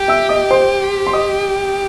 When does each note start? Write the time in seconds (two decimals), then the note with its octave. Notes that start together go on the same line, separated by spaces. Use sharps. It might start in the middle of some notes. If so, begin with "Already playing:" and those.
Already playing: G4
0.08 E5 E6
0.29 D#5 D#6
0.50 C5 C6
1.07 C6
1.13 D#5 D#6